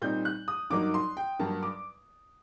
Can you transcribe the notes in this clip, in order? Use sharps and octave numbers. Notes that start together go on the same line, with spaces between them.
A#2 G3 C4 D#4 G6
F#6
D#6
G2 F#3 A#3 D#4 D6
C6
G5
G2 F#3 A#3 A5
D6